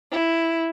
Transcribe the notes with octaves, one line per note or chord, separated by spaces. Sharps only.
E4